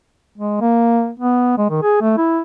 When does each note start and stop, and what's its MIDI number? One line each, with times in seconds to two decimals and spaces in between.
0.38 0.58 56
0.61 1.11 58
1.19 1.57 59
1.58 1.67 56
1.70 1.81 51
1.82 2.00 68
2.01 2.17 57
2.17 2.41 64